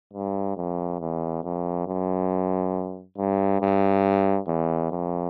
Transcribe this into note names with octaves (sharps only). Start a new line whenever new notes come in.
G2
F2
E2
F2
F#2
G2
G2
E2
F2